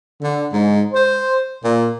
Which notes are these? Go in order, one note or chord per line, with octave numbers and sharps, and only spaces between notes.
D3
G#2
C5
A#2